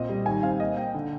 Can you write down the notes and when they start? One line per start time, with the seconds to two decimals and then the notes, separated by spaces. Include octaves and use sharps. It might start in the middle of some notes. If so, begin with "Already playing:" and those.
Already playing: A#2 C4 D#5
0.09 G3
0.26 D#3 G#5
0.43 C4 F5
0.60 A#3 D#5
0.77 A#3 G5
0.94 D3